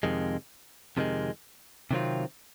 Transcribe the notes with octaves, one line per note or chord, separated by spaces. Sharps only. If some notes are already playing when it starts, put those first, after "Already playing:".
F2 C3 D#3 G#3
F2 C3 D#3 G#3
C3 D#3 F#3 C4 F4